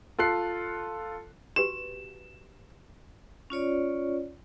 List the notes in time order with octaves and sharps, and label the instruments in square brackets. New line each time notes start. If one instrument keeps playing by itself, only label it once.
[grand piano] F4 A4 F#6 C7
[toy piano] F#4 G4 B4 [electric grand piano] E7
[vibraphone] C#4 F4 C#5 D5